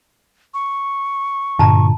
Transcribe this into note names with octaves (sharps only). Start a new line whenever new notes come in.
C#6
G2 A#2 D3 A5 A#5